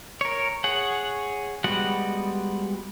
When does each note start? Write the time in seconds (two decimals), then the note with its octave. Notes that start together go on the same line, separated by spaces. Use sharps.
0.21 A#4 C#5
0.64 G#4 C#5 F#5
1.64 G3 G#3 B3 F#4 F#5